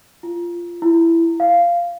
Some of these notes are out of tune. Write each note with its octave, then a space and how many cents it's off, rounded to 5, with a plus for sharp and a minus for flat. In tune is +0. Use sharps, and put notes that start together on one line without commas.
F4 -15
E4 +15
F5 -10